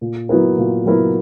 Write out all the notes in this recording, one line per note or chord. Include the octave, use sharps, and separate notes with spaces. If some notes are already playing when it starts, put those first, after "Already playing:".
A#2
F#3 B3 E4 A#4
A#2
F#3 B3 E4 A#4